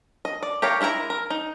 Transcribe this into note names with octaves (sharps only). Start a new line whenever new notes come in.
D#5
D5
G4 A#4 C#5 F5
G#3 E4 A#4 B4 A#5
A#4
D#4